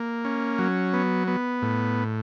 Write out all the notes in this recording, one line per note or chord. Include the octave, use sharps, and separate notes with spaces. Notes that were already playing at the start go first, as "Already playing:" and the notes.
Already playing: A#3
C#4
F#3
B3
B3
A2